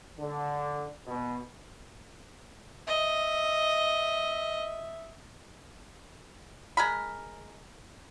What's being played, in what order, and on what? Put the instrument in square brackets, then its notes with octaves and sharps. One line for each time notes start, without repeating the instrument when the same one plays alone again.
[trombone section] D3
B2
[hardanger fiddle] D#5 [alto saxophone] E5
[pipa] G#3 A#4 B5